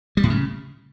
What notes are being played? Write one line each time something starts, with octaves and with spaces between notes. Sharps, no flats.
G3
A2
C#3